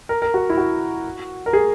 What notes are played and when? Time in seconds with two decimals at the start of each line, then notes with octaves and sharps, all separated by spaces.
0.09 A#4
0.22 A#4
0.34 F#4
0.50 E4
0.58 F#4
1.46 A#4
1.53 G#4